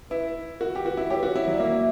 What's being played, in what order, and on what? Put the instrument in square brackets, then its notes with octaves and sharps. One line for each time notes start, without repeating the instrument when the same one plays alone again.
[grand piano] E4 [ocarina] B4
[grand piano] F#4 [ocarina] A#4
[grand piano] G4
[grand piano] F#4 [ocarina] B4
[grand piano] E4
[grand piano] G4 [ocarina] C#5
[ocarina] B4
[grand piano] F#4 [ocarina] C#5
[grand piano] E4 [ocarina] C#5
[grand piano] F#3 [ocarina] D5
[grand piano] A#3 [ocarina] E5